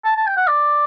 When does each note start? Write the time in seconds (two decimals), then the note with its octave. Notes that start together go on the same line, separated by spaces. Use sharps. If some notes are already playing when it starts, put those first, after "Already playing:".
0.05 A5
0.16 A5
0.27 G5
0.37 F#5
0.48 D5